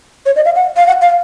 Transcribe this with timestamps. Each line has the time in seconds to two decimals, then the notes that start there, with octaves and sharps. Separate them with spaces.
0.26 C#5
0.36 D#5
0.45 F5
0.56 F#5
0.77 F5
0.87 F#5
1.02 F5